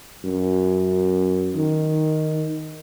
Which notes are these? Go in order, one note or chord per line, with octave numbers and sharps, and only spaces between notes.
F#2
D#3